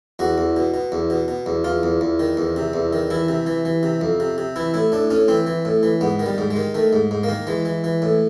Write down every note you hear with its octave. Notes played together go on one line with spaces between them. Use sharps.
E2 F#4
E2
B2
B2
E2
B2
B2
E2
E2 F4
E2
E2
D#3
E2
C3
E2
D#3
E3 E4
C3
E3
E3
C3
F2
C3
C3
E3 E4
A2 E4
A2 D4
A2 C#4
E3 C4
E3
A2
E3
G#2 B3
D#3
G3
G#2
G#3
D#3
D#3 A3
G#2
G#2
A#3
D#3
E3 G#3
E3
E3
A2